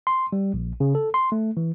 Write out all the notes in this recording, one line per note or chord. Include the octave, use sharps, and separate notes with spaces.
C6
G3
A#1
C#3
A4
C6
A3
E3